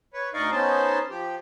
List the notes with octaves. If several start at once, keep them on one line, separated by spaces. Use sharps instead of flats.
B4 C#5
D2 D#4 D5 D#5 F5 C#6
B3 C#4 D#4 C5 A5
F3 G4